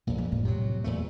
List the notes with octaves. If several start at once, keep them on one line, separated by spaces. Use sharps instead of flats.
A#1 F2 A#2
F3
A2
C3 F#3
E2 A#2 A3